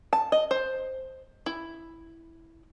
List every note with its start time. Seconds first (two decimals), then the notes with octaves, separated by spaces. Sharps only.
0.13 A5
0.32 D#5
0.51 C5
1.46 E4